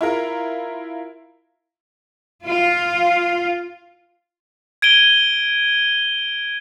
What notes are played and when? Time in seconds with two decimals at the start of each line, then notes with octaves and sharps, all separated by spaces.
0.01 E4 F4 A#4
2.46 F4
4.82 G#6 D7 D#7 G7